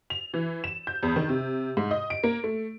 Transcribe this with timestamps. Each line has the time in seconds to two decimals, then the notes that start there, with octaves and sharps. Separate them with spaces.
0.10 F7
0.34 E3
0.64 E7
0.87 G6
1.03 E2
1.16 D#3
1.29 C3
1.77 G#2
1.91 D#5
2.10 D7
2.24 A#3
2.44 A3